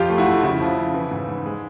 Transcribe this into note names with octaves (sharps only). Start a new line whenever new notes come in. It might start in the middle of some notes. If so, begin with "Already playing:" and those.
Already playing: F2 F4 G4
A3
E4 F#4
F2
C#3 E4
F3
C#3
E3
G#2
G#2
G#3